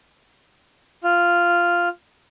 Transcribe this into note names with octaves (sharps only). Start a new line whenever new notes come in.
F4